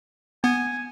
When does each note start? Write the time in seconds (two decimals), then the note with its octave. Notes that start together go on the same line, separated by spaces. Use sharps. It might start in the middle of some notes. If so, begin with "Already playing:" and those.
0.44 B3 G#5